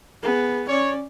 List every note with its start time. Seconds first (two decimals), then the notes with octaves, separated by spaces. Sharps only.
0.23 B3 G#4
0.68 C#4 C#5 D5